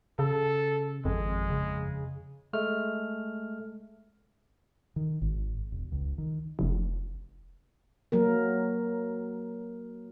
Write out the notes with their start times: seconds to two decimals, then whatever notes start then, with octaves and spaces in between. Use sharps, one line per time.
0.19 C#3 A4
1.05 G#1 F2 G#3
1.50 C#3
2.53 G#3 A3 F6
4.96 D#3
5.22 G#1
5.72 E1
5.92 C#2
6.18 D#3
6.59 F1
8.12 F#3 A#3 A#4